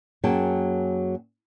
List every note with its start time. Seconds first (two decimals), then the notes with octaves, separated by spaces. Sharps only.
0.23 F#2 F#3 A#3 G#4 G5 A5